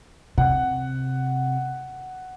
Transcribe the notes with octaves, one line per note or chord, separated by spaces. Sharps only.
C3 F#5